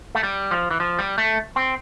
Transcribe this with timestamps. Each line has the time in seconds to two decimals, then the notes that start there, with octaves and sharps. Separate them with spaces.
0.15 A3
0.23 G3
0.51 F3
0.71 E3
0.80 F3
0.99 G3
1.18 A3
1.56 C4